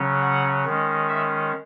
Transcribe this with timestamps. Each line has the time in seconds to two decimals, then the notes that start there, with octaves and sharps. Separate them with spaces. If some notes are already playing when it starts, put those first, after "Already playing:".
Already playing: C#3 F#3 C#4
0.22 F#5
0.65 D#3 G#3 C#4
1.09 E5